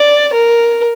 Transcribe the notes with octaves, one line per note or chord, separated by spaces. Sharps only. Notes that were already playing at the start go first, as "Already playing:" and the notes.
Already playing: D5
A#4